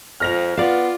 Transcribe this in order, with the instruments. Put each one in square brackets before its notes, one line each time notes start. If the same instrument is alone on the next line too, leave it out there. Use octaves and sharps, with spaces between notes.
[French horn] F2 [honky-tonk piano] F6 A#6 F7
[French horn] B3 [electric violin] F4 [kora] D5 F5